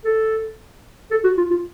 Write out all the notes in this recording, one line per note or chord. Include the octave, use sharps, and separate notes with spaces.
A4
A4
F#4
F4
F4